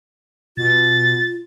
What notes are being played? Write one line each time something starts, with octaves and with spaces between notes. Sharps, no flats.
B2 F4 A6